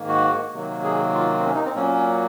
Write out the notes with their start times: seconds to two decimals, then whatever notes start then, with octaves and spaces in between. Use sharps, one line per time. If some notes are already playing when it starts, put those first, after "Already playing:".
Already playing: G#2 D#3 A#3
0.08 F#4
0.54 C3 D#3 F#3 A#3
0.84 G#4
1.14 F4
1.39 C4
1.45 C#4
1.55 D#4
1.65 C4
1.75 A#2 F#3 A#3 C#4